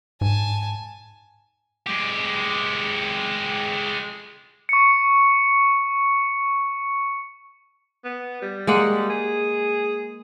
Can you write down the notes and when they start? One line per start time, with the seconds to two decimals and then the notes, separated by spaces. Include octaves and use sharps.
0.21 G#2 G#5 A5
1.87 G#3 G4
4.69 C#6 C#7
8.04 B3
8.42 G3
8.67 G#3 A#3 F#5
9.10 G#4